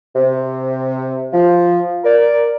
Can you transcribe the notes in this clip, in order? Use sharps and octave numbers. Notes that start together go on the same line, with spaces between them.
C3
F3
A#4 D5